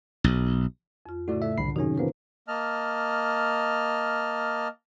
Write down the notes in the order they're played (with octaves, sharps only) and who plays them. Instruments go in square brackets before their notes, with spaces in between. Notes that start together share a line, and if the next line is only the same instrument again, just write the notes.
[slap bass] B1
[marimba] F2 F4
[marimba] A2 C#3 [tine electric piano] A3 F#4 [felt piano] E4 D5
[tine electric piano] A3 E5
[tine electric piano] C2 B5 C7 [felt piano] D3
[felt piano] F#2 [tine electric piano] C3 D#3 C#4 [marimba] D#4 G#4
[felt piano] F3 A#3 B3 [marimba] B4 C5
[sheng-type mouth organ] A#3 D#5 A5 F6